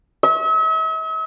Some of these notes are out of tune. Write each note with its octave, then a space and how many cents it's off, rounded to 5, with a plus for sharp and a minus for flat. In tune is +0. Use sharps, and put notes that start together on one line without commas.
E5 -45